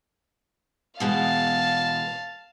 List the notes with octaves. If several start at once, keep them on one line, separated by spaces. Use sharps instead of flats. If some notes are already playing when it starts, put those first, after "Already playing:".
B2 E3 G#3 F5 A5